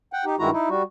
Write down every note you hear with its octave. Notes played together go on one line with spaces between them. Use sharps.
F#5 G5
D#4 G4
G2 D#3 G#3 E4 F#4 A#5
D#4 E4
G3 F#4